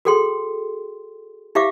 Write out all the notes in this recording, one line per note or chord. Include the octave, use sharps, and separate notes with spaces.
F#4 G#4 A4 G5 C6
E4 G4 E5 F5 D6